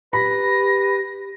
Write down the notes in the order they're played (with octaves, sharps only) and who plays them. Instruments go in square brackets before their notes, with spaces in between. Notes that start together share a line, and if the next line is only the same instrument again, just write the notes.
[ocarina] G4 [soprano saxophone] B4 [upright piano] B5 [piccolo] A#6